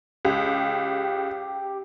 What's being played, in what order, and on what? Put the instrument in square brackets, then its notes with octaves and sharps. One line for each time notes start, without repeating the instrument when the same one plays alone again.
[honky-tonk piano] C#2 [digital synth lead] G4